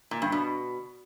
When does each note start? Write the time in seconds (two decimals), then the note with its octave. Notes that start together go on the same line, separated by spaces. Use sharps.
0.11 A#2
0.22 G2
0.32 B2